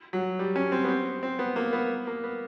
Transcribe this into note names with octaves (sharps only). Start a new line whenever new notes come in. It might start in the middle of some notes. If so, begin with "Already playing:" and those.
F#3
G3
C#4
C4
B3
C4
C4
B3
A#3
B3
A#3
B3